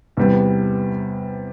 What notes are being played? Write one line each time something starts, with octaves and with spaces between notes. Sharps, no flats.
E2 C3 G3 B3